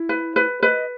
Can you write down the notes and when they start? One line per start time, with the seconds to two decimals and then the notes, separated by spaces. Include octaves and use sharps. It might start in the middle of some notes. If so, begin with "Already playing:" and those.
Already playing: E4
0.09 B4
0.36 B4
0.62 B4 D#5